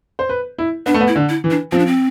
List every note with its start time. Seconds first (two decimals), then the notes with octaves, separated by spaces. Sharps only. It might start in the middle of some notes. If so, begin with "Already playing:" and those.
0.19 C5
0.29 B4
0.59 E4
0.86 B3 D4
0.94 A3
1.01 B3
1.08 E4
1.16 D3
1.29 E4
1.44 E3
1.51 D4
1.72 F3 C4
1.79 D4
1.86 C4